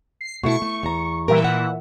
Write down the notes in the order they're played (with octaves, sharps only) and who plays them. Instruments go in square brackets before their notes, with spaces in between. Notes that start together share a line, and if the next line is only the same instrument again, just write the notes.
[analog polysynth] C7
[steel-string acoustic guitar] B2 A3 E4 [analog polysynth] C#6
[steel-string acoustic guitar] A3
E2 A#5
[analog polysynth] A#2 E3 E5 [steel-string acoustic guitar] G3 G4 A#4
[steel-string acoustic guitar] F#5